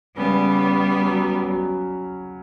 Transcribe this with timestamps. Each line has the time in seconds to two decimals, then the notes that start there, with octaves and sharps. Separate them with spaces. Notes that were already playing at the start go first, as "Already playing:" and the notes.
0.17 C#3 G3 B3
0.58 C#4
1.01 F#3
1.43 F#3